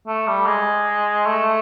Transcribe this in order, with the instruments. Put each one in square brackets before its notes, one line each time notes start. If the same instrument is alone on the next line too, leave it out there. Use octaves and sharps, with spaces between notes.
[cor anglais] A3
G3
G#3
A3